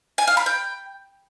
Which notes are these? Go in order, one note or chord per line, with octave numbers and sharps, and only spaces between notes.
G#5
F5
B5
G5